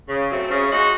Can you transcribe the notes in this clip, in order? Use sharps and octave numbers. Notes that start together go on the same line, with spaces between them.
C#3
F#3 A3 C4
C#3
G#3 D#4 F#4